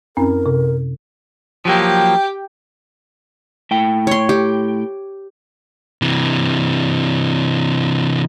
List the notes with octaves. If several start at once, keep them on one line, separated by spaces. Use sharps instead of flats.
F#2 C4 C#4 A#4
C3
F3 F#3 A#3 G4 G5
A2 G5
C#5 C6
G4
C3 E3